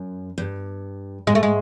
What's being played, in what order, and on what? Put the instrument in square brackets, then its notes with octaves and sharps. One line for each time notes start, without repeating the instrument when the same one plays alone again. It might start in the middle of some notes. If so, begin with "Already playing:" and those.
Already playing: [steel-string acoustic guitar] F#2
G2
[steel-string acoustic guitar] G#2 [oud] G#3
[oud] A3
G#3